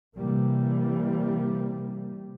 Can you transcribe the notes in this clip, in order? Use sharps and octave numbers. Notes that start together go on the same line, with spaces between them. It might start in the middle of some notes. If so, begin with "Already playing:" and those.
C3 E3 G3 A#3